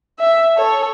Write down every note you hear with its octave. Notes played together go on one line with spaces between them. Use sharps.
E5
A4 C#5